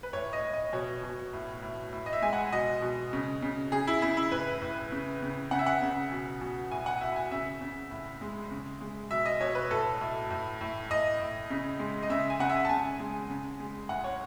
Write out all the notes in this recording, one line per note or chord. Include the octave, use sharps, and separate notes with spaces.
B4
A2 C#5
D#5
A2
D#5
B2 C#5
B2
A2
A2
A2
D#5
E5
G#3 G#5
F#5
B2 D#5
B2
C#3
C#3
C#3 G#4
E4
C#3 E4
E4
A2 B4
A2
C#3
C#3
C#3 F#5
E5
F#5
C#3
B2
B2
A2 G#5
F#5
A2 E5
G#5
C#3 E5
C#3
A2
G#3
C#3
G#3
B2 E5
D#5
B2 C#5
B4
A2 A4
A2
A2
A2
A2 D#5
A2
C#3
G#3
D#5
C#3 E5
G#5
C#3 F#5
E5
A5
C#3 G#5
G#3
C#3
G#3
A2 F#5
C#5